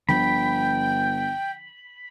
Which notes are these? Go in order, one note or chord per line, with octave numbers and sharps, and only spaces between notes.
G1 D3 F3 D4 G5 B5